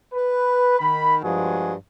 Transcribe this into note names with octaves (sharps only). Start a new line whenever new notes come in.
B4
D#3 B5
G2 F3 G#3 F#4 G#4